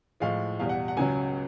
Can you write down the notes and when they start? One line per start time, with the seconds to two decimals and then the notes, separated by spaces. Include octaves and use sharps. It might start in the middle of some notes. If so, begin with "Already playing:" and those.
0.20 A2 F3 G#3 F5
0.59 E2 B2 G3 F5
0.69 F#5
0.88 F#5
0.97 C#2 C#3 F#3 G#5